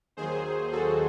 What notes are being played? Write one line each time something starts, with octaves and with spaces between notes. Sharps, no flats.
D#2 D#3 F#3 G#4 C5
F#4 A4